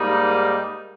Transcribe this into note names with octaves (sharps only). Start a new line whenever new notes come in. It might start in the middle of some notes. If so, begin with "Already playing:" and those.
Already playing: G#2 G3 A#3 D#4